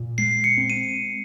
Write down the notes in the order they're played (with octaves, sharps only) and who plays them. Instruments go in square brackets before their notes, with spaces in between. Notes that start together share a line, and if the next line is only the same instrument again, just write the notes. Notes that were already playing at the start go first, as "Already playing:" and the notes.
Already playing: [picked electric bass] A#2
[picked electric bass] G#3 [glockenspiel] C7
[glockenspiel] C#7
[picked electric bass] C4
[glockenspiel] D#7